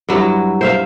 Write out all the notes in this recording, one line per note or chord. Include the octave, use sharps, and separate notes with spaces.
G2 F#3 E4
C5 E5 F5